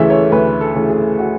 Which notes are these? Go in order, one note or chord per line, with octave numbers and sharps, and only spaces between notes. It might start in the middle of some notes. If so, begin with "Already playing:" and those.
Already playing: D2 C#3 E3 A3 E5
C#5
D2 B4
A4
C#3 E3 A3
G#4
F#4